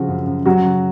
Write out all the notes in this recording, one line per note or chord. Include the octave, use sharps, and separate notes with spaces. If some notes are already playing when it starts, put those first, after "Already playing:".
Already playing: C#3 F3 F#4
F#2
F#2
F#3 F#4
C#3